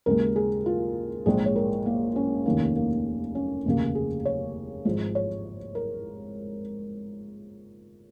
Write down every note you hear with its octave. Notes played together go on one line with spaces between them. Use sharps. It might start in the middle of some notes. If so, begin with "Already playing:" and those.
D#2 C#3 G#3 A#4
G#4
F4
A#1 G#2 G#3 G#4
C#5
A#4
A#3
C#4
F1 D#2 D#3 A#3
A#3
C#4
F1 D#2 C#3 A#3
G#4
C#5
G#1 G#2 F3 G#3
C#5
A#4